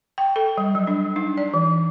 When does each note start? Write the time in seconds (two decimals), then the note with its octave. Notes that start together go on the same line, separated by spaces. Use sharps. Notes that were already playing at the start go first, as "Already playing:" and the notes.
0.18 G5
0.36 A4
0.58 G3
0.75 F#3
0.87 D4
1.16 D#4
1.37 D5
1.54 E3